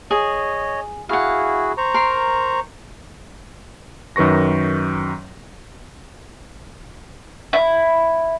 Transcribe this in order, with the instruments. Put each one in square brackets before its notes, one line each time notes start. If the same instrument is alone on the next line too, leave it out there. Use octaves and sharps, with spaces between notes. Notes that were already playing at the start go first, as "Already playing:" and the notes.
[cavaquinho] G#4 [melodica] C#5 D#5
[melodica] E4 F#4 G#4 [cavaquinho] F5 F#5
[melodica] C5 A#5 C#6
[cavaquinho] A#4 C6
[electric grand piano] F#2 D#3 B4 C#6 A#6
[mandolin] E4